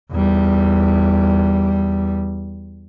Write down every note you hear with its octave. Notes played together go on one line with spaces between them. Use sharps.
E2 G3